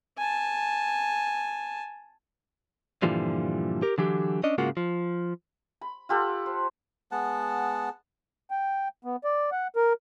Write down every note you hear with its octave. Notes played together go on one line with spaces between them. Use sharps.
G#5 A5
G2 A#2 D3 E3 F3 G3
G4 A#4
D3 E3 F#3 G4
C#4 D4 D#5
G#2 C#3 G#3 A#3 F4 F#4
F3
B5
F4 G4 A4 F#5
C5
G#3 B3 F#5 A5
G5
B3
D5
F#5
A#4